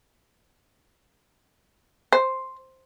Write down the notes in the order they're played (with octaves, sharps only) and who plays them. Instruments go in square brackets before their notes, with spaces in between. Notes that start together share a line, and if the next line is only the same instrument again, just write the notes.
[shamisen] C5